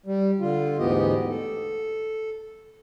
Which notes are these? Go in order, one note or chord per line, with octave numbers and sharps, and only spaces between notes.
G3
D3 F4
D2 G#2 E3 B3 G4 D#5
A4